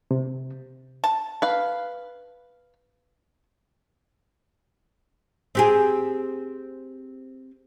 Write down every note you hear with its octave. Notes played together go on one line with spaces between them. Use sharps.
C3
A5
B4 F5
C4 G4 G#4